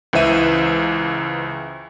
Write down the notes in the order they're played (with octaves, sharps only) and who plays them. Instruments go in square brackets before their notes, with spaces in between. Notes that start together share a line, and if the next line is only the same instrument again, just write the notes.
[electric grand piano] C#2 E3 C5 E5 D#7